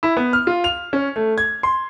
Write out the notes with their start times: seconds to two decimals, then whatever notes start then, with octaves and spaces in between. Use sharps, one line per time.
0.03 E4
0.17 B3
0.33 F6
0.47 F4
0.64 F7
0.93 C#4
1.16 A3
1.38 G#6
1.63 C6